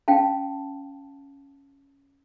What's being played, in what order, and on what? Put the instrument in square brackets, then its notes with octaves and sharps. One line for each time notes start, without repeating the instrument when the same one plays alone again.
[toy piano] C#4 F5 G5 A5